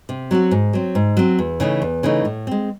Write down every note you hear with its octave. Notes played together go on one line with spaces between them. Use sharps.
C3
F#3 C4 F#4
G#2
F#3 C4
G#2
F#3 C4
E2
C#3 E3 A3 D#4
E2
C#3 E3 A3 D#4
A2
G#3 C4